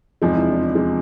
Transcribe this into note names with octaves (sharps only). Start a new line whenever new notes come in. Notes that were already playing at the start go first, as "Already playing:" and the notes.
E2 C3 F3 G#3 D#4
E4
D4
D4
C3 F3 G#3